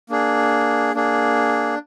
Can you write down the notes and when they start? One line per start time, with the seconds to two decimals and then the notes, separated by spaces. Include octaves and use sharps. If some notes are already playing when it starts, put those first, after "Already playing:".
0.10 A#3 D4 G#4
0.95 A#3 D4 G#4